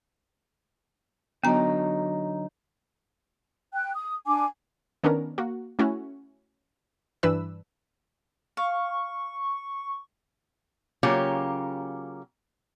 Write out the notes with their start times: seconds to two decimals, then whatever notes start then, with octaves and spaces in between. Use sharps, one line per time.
1.44 D3 F#3 B3 D#4 A#5
3.73 G5 F#6
3.95 D#6
4.27 D4 G#5 D6
5.04 D#3 B3 C#4 D4 A#4
5.38 A#3 F#4
5.79 A3 C#4 E4 F#4
7.23 G2 E3 D4 B4 E6
8.57 F5 C#6
11.03 C#3 F#3 A#3 C#4 F4 G4